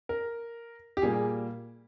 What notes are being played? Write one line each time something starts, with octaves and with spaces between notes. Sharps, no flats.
A#4
G4
A#2 G3 A#3 G#4